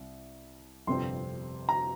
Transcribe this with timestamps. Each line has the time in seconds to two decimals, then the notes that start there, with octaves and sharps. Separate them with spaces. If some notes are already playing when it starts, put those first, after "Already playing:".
Already playing: C2
0.87 G1 F2 C3 G3 C4 C6
1.69 A#5